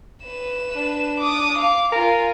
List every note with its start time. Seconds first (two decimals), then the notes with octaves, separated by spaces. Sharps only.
0.24 B4 E7
0.76 D4
1.20 D6 D#6
1.58 F5 D6
1.92 F4 A#4 G#5